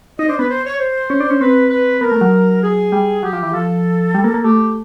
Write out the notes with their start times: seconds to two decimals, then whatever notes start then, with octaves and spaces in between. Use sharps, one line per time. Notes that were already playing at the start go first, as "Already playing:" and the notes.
0.19 D#4 D#5
0.29 D4 C5
0.39 B3 B4
0.50 C5
0.65 C#5
0.79 C5
1.10 C#4
1.20 D4
1.30 C#4
1.41 C4 B4
1.70 B4
2.01 B3 A#4
2.12 A3
2.21 F#3
2.63 G#4
2.92 G3
3.23 F#3 G4
3.33 F3
3.43 E3
3.53 F3 A4
4.14 G3
4.24 A#3
4.34 A#3
4.44 A3 G4